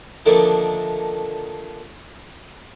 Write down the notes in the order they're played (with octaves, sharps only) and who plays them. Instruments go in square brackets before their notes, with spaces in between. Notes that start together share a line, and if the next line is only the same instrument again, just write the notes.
[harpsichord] D3 D#3 F3 A3 A#3 D4